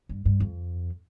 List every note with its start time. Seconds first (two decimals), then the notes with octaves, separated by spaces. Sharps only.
0.09 G2
0.25 G2
0.40 F2